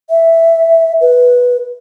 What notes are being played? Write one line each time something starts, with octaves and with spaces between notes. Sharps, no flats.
E5
B4